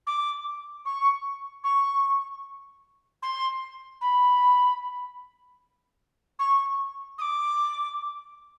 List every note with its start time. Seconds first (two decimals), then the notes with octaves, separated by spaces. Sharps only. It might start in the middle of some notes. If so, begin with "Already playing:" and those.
0.06 D6
0.85 C#6
1.63 C#6
3.22 C6
4.01 B5
6.39 C#6
7.18 D#6
7.21 D6